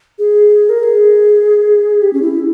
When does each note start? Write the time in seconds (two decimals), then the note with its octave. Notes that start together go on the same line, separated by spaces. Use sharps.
0.19 G#4
0.69 A#4
0.80 A#4
0.83 G#4
2.02 G4
2.13 C#4
2.22 E4